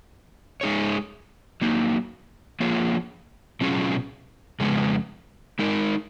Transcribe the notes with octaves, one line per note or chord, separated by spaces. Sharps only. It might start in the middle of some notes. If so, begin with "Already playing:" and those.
G#3 D#4 G#4 C#5
F#3 A#3 D#4
F3 A#3 F4 G#4 C#5
B2 F#3 C#4 F4 G#4
F2 C#3 G#3 B3
G#3 D#4 A#4